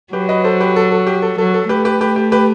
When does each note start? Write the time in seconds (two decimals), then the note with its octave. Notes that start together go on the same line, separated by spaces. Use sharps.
0.13 F#3 G4 B4
0.29 B4 D#5
0.44 A4 C5
0.60 G4 B4
0.76 A4
0.92 A4
1.07 G4
1.22 A4
1.38 F#3 A4
1.54 A4
1.69 A3 G4 B4
1.85 G4 B4
2.01 G4 B4
2.16 G4
2.32 G4 B4